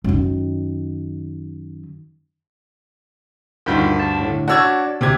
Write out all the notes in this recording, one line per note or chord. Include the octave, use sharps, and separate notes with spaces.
F#2 D#3
D2 G2 D#3 F4 G6
A5
A2 D3
D4 F#4 C#5 D5 E6 G#6
D2 C3 G4 G#6